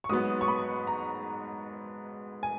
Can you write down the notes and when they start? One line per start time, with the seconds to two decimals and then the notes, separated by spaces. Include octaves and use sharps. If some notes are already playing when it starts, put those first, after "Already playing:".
0.04 C#6
0.09 G#2 F#3 B3 D#6
0.41 C#6
0.48 B5
0.87 A#5
2.43 G#5